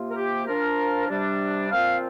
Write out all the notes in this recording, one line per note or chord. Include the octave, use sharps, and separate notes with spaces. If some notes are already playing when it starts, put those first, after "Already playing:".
Already playing: C3 A#3 F4
A#4
G4
F3 D4 F4 A#4
C3 G3 D4
A#2 F3 C4 F4 F5